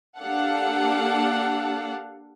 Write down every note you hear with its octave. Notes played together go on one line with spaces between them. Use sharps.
A#3 D4 G4 A4 F5 F#5